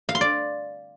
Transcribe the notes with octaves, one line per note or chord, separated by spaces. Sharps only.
F5
C6
D5